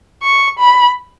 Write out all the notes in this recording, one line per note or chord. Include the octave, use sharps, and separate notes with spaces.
C#6
B5